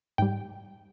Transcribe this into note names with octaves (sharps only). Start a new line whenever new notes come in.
G#2 G3 G5